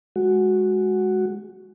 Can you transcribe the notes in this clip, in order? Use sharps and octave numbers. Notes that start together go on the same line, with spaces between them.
G#3 F#4